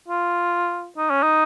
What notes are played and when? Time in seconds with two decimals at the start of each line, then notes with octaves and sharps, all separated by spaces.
0.08 F4
0.97 D#4
1.10 C#4
1.23 D#4